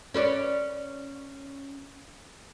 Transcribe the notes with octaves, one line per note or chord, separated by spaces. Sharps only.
C#4 B4 D5